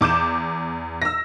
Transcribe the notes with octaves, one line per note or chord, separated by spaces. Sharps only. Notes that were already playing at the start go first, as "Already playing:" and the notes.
E2 D6 G6 E7
E6 A#6